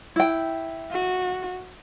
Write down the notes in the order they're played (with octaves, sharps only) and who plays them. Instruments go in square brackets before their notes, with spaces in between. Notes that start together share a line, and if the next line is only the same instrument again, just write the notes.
[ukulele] E4 G5
[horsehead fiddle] F#4